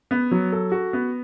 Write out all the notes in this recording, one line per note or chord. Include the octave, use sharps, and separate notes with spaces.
B3
F#3
A4
F#4
B3